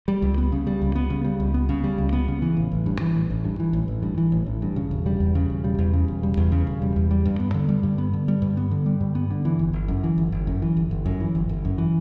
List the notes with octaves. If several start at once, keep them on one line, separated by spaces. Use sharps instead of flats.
G3
C#2
B3
C#3
G3
C#2
B3
C#3
G3
C#2
B3
C#3
G3
C#2
B3
C#3
E3
A1
A1
G2
E3
A1
A1
G2
E3
A1
A1
G2
E3
A1
A1
G2
C#3
E1
G3
E2
C#3
E1
G3
E2
C#3
E1
G3
E2
C#3
E1
G3
E2
G3
G2
B3
D3
G3
G2
B3
D3
G3
G2
B3
D3
G3
G2
B3
D3
E3
G1
G1
F#2
E3
G1
G1
F#2
E3
G1
G1
F#2
E3
G1
G1
F#2
E3